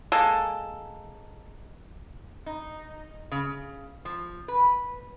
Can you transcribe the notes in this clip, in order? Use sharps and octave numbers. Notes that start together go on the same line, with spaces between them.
G#3 A#3 A4
D#4
C#3
F3
B4